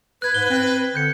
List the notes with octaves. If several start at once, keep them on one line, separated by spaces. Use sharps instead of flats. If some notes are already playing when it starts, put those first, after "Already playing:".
B4 F#6 G#6
G#2 G7
C4
D3 G6 C#7